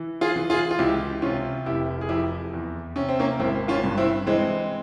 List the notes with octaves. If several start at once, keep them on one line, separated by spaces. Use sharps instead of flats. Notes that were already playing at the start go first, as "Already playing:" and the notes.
Already playing: E3
F4 G#4
E3
F4 G#4
F4
C#2 E4 G4
C3 C#4 F4
F1 E4 G4
G#4
F2 E4 G4
E2
C3 C#4
C4
A#3 C#4
G#1 C4 E4
C#4 F4
G2
C4 E4
E3 G#3 C4